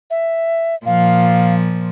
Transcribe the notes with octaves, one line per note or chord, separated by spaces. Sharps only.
E5
A#2 F3 F5